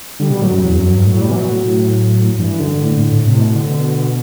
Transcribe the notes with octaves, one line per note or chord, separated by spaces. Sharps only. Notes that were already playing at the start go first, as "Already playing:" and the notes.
D3 G3
B2 G3
A2 F#3
F#2
E2
F#2
G2
A2 F#3
G3
B2 E3
F#3
A2
G2 E3
F#2
D3
G2
A2
A2
A2
A2 C3
B2
D3
B2